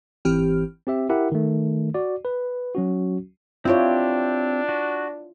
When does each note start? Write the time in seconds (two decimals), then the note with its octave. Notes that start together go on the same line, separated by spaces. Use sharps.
0.25 G#1 E3 C4 G4 F6
0.87 C4 G4 E5
1.09 E4 G4 A#4 E5 F#5
1.32 D#3 A3
1.94 F#4 D5
2.25 B4
2.75 F#3 C#4 F#4
3.65 C4 D4 E4 F4 G4 C#5
4.69 F#4